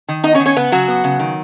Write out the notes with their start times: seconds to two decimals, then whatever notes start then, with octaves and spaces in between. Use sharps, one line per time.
0.08 D#3
0.24 B3 D#4 D#5
0.35 C#4 C#5
0.40 D#3
0.46 C#4 C#5
0.56 C#3 B3 B4
0.72 C#3 F#3 F#4
0.88 B3
1.04 C#3
1.20 D#3